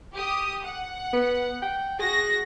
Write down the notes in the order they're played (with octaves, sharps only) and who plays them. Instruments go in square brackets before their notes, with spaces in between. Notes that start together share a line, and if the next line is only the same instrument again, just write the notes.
[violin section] G4 D#6
F#5
[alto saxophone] B3
G5
[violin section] F#4 A#6 [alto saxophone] G#4